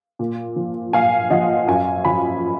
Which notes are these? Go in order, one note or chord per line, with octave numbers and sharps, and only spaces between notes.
A#2
F3
A#2 F5 G#5
F3 D#5 F#5
F#2 F5 G#5
F3 G#5 B5